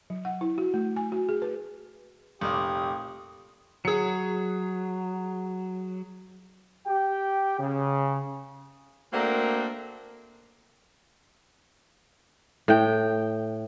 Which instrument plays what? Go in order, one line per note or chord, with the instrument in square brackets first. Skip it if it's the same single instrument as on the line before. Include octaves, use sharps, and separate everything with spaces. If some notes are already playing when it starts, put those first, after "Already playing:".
[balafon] F#3
F#5
E4
F#4
A3
G#5
F#4
G#4
B4
[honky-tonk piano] F1 [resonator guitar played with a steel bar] A#2 D5 [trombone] G4 [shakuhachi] D#6
[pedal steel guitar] F#3 [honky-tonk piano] G#4 C#7
[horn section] G4 G5
C#3
[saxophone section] A3 A#3 C4 D4 F#4 A#4
[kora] A2 G5